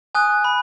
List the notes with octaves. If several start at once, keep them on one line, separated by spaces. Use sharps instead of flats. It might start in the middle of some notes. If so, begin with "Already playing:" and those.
G#5 D#6 F#6
B5